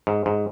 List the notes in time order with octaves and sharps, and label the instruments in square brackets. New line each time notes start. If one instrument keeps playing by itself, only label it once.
[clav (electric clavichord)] G#2
G#2